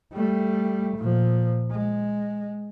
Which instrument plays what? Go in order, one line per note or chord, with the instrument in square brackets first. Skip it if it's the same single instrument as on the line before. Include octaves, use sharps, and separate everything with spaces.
[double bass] G3 A3
A#2 F3
G#3